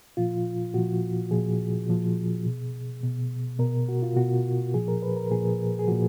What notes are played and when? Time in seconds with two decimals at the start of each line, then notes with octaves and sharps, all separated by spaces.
0.17 A#2 F3 F4
0.74 A#2 F3 F#4
1.31 A#2 F3 G#4
1.88 A#2 F3
2.46 B2
3.03 B2
3.59 B2 A#4
3.89 F#4
4.03 F4
4.16 B2 F#4
4.74 A#2 F3 G#4
4.88 A#4
5.02 B4
5.16 A#4
5.30 A#2 F3 G#4
5.79 G#4
5.88 A#2 F3 F#4